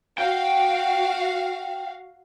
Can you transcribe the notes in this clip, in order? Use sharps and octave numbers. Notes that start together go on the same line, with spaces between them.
F#4 F5 G5